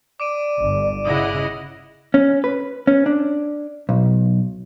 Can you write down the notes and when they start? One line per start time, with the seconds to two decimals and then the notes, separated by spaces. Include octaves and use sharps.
0.20 D5 D6 D7 D#7
0.57 G1
1.05 C#3 E4 D#5 F#5 D#6 A#6
2.14 C#4
2.44 B4
2.87 C#4
3.06 D4
3.89 B1